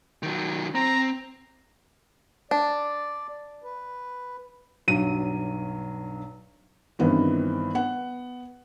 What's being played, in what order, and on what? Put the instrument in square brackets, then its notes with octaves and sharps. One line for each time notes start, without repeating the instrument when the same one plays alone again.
[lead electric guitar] D#3 F#3
[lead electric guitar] C4 [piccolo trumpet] A#5
[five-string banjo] D4 [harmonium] D5
[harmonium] B4
[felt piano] B1 G2 F#3 D#7
G2 D#3 E3 B3 C4
B3 F#5